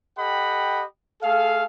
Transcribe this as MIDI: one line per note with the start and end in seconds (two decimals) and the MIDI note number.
0.18 0.84 67
0.18 0.84 69
0.18 0.84 75
0.18 0.84 78
0.18 0.84 79
0.18 0.84 83
1.23 1.64 57
1.23 1.64 68
1.23 1.64 69
1.23 1.64 77